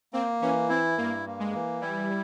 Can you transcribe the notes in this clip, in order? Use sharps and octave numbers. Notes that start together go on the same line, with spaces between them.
A#3 C4
E3 C#4
C4 E4
G2 A#3
A#3
G#3
E3
G3 E4